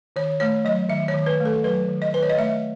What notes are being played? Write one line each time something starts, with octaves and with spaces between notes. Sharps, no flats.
D#3 C#5
A3 C#5
F#3 D#5
D#3 E5
C#5
D#3
B4
A3
A4
F#3 B4
D#3
D#5
D#3 B4
C#5
D#5
A3 E5